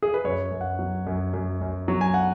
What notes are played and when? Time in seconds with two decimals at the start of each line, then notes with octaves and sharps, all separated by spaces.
0.03 G#4
0.14 B4
0.25 F#2 C#5
0.51 F#2
0.61 F#5
0.79 F#3
1.07 F#2
1.34 F#2
1.61 F#2
1.88 F#3
2.01 G#5
2.14 F#5